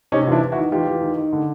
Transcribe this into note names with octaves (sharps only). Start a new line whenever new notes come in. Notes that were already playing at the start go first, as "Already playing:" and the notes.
C3 C#4 D#4
E2 D4 E4 F4
E2
E4 F#4
D#3
E2 F4 G4
E2
D#3
D#3
D3